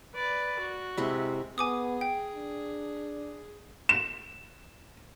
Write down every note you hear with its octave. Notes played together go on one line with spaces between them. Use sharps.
B4 D5
F#4
C3 G#3 E4
B3 G#4 G#5 D6 D#6
G5
D4
E7